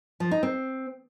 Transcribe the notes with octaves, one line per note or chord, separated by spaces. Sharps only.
F3
D#4
C4